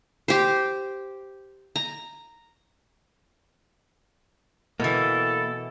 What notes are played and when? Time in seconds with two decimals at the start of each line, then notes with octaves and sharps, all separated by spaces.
0.28 G4 C5
1.76 A#5
4.80 B2 E3 A#3 E4 A4